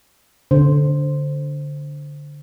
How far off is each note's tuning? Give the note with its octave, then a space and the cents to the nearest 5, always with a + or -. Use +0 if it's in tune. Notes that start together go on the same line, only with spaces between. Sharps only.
D3 -10 C5 +0